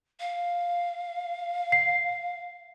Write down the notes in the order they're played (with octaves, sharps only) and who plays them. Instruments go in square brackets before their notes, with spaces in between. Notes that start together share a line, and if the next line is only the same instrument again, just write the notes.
[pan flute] F5
[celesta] C7